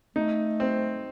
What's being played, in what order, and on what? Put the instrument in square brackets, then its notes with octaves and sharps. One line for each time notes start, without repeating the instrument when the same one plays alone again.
[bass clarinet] A3 [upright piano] D#4
[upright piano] C4